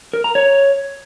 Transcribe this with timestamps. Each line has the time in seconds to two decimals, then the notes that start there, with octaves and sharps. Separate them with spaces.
0.13 A#4
0.24 A#5
0.35 C#5